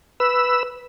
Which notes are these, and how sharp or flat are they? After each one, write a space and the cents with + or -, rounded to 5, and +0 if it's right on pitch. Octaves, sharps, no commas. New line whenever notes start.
B4 +0 E6 +0